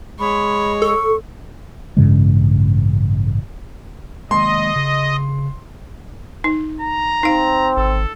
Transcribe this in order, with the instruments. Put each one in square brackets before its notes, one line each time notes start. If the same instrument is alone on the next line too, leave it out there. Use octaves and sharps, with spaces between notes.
[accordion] G#3 [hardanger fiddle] C#5 [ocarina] B5
[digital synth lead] A4 [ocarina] C#6
[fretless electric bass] A1 G2 C#3 G#3
[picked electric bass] D#3 G#3 A#3 [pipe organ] D#5 [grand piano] C6
[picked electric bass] C#3
[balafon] D#4
[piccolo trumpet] A#5
[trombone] C4 [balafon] D#4 F5
[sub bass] G#1 [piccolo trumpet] A4